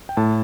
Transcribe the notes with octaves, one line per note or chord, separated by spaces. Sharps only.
G5
A2 A5